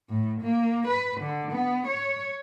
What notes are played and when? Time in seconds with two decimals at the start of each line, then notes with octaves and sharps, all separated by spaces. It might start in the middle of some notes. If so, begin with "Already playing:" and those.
0.10 A2
0.42 A#3
0.87 B4
1.21 D3
1.52 B3
1.87 C#5